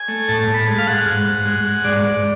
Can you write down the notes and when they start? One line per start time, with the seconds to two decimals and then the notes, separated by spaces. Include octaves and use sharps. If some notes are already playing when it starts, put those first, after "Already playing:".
Already playing: G#5
0.08 A3
0.29 A2 A5
0.42 A5
0.48 A2
0.54 B5
0.67 G#3 A5
0.78 F5
0.87 G#3 F#5
1.06 G#2
1.26 G#2
1.45 G#3
1.65 G#3
1.84 G#2 D5
2.04 G#2